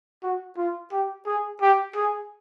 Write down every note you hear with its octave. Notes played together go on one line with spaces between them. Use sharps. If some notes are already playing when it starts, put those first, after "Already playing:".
F#4
F4
G4
G#4
G4
G#4